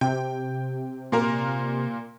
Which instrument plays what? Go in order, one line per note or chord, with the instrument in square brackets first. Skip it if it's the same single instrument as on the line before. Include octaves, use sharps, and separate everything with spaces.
[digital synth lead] C3 [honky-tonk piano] G5
[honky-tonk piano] A#2 A#3 A#4